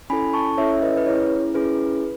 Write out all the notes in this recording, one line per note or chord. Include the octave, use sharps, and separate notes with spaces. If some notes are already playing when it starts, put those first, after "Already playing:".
C#4 E4 A4 G#5 B5
A5 C#6
C#4 E4 A4 C#5 E5
E5
B4 D#5
B4
C#4 E4 G#4 C#5
C#4 E4 G#4 B4